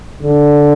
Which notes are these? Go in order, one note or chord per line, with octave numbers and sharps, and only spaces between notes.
D3